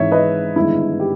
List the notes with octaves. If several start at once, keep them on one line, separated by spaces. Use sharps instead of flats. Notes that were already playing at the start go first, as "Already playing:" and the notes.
Already playing: G#1 G#2 E3 G#3 C#5 E5
B4 D#5
G1 G2 D#3 G#3 E4
G4